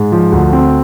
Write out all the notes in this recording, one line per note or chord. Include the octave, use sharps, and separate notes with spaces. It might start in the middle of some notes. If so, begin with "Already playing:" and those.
Already playing: G#2
F3
D2
C4